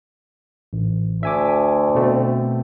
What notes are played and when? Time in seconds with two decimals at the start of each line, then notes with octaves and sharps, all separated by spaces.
0.73 A1
1.23 D2 E5 G#5 D6
1.95 B2 A3 C4